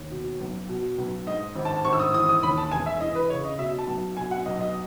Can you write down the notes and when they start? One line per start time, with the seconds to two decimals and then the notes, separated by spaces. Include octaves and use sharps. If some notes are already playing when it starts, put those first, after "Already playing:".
Already playing: D#2
0.11 B2
0.40 B1
0.69 B2
0.98 B1
1.27 G#2 D#5
1.55 G#1
1.65 A5
1.85 G#1 C#6
1.93 E6
1.99 D#6
2.14 E3 D#6
2.29 D#6
2.43 D#2 B5
2.58 A5
2.71 E1 G#5
2.86 E5
3.00 E3 D#5
3.15 B4
3.30 C#3 C#5
3.45 D#5
3.58 B2 E5
3.78 A5
3.88 B1
4.17 B2 G#5
4.31 F#5
4.46 B1 D#5
4.61 D#5